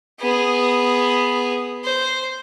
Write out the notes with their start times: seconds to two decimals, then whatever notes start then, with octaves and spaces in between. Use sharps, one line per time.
0.20 B3 G#4
1.84 C5